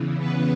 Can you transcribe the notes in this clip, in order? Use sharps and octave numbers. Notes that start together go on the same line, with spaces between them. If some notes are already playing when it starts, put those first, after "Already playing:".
Already playing: E2 C#3 E3
B3 B4